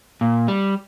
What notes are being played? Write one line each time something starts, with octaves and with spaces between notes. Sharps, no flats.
A#2
G3